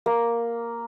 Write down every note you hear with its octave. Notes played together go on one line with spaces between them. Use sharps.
A#3